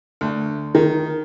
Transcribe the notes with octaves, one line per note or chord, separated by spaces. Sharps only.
D2
D#3